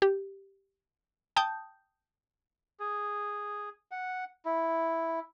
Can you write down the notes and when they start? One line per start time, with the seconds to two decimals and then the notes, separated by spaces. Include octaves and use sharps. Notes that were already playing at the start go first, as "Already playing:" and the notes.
0.02 G4
1.36 G5 A5 D#6 G6
2.80 G#4
3.91 F#5
4.45 E4